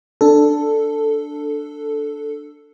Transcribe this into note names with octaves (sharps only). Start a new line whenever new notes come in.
D4 A4